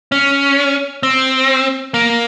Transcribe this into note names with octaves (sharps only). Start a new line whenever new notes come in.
C#4
C4
A#3